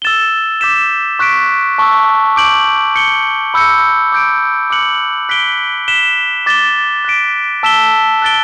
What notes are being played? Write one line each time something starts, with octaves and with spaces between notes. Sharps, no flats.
E6 A6 E7 G7
D6 G6 B6 E7
C#6 F#6 B6 D7
A5 C#6 E6
D6 G6 D7 F#7
G6 C#7 G7
B5 E6 G6 C#7
D6 G6 D7
D6 F#6 C#7 F#7
F#6 B6 D7 G7
F#6 B6 E7 G7
D6 A6 E7 G7
F#6 B6 D7
A5 E6 B6 E7 G7
F#6 A6 D7 G7